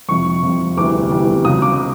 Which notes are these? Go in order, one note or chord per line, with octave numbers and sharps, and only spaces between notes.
F2 C3 F3 C#6
F2 C3 F3
E1 D2 C3 E3 G3 D6
E1 D2 C3 E3 G3
C#2 C#3 F#3 D#6
D6